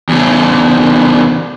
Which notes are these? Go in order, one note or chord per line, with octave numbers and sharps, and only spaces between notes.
E2 C#3